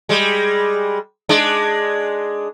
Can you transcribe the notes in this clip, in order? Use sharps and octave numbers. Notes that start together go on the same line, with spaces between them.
G3 G#3
G#3 D4